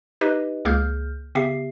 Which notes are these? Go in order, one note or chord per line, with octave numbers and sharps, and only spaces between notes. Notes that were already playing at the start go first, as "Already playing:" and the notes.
D#4 G4 B4 D#5
C#2 A#3 G#4 F6 G6
C#3 B3 G4 E5 C7